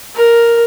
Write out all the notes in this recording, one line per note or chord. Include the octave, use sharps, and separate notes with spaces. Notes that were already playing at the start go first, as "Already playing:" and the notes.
A#4